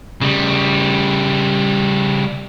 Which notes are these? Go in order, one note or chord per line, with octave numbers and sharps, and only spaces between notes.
C#3 G3